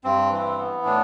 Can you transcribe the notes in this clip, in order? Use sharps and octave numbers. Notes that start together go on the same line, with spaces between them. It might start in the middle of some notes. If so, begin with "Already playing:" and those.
G2 C4
E3
B3
A2 D4